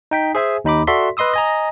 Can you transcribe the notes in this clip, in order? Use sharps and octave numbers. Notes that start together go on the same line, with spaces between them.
D#4 G5 B6
G#4 C5 E5 G#5
D#2 D#4 B5 D6
F#4 A4 D5 E5 C6 B6
B4 D#5 C6 D#6 E6
D#5 G#5 A#5